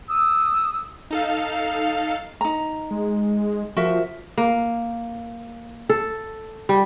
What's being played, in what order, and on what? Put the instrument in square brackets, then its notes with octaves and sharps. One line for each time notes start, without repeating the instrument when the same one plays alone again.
[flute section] D#6 E6
[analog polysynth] D#4 A4 F5
[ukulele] D#4 A#5
[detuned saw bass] G#3
[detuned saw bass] F3 [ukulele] F#4 A#4 E5
[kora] A#3
A4
G3